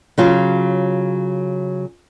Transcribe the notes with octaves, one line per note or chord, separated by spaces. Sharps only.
C#3 F#3 F4